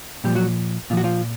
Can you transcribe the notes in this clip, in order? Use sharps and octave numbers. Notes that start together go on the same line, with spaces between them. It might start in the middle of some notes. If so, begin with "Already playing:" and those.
A#2 F3 G3 G4
F#3 F#4
A#2 F3 F4
F#4
F3 F4